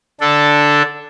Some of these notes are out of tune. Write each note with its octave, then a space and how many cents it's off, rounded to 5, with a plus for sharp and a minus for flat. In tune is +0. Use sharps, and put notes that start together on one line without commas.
D3 +0 D4 +0 A4 +0